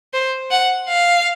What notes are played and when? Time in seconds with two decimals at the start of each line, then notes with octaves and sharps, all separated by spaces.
0.14 C5
0.51 F#5
0.89 F5